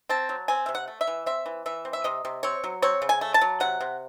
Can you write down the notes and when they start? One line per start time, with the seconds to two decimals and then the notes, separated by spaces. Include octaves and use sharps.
0.09 C4 A5
0.29 F#3
0.48 C4 G#5
0.66 C3 E5
0.75 F#5
0.88 A3
1.01 E5
1.07 E3
1.26 C4 E5
1.46 E3
1.66 E3 E5
1.85 C4
1.93 E5
2.04 C3 D#5
2.25 C3
2.43 C4 C#5
2.64 F#3
2.82 C4 C#5
3.02 C#3
3.09 G#5
3.21 A3
3.34 A5
3.41 F#3
3.60 C3 F#5
3.80 C3